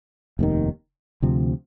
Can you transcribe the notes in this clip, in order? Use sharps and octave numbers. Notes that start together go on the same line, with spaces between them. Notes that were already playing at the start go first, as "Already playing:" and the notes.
F1 D#2 D#3
D2 C3 F3 C4